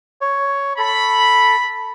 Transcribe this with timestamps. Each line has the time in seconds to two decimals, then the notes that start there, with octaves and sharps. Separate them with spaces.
0.21 C#5
0.78 A4 B5